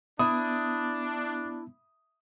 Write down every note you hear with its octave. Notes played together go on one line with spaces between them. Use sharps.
B3 D4 E4 D#6